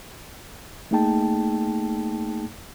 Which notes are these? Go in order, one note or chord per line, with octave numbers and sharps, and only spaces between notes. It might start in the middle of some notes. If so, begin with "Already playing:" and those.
A3 A#3 D#4 G#4 G5 A5